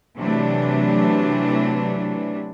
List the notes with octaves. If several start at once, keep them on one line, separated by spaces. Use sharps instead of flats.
C3 E3 F#3 A3 D4